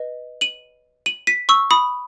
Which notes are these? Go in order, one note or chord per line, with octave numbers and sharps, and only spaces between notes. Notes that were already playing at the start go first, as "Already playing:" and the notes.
Already playing: B4 D#5
D#7 F#7
D#7 F#7
B6 D#7
C#6 E6
B5 D#6